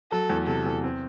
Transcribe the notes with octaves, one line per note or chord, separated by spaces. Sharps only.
F#3 A4
E2
C3 A4
E2
C4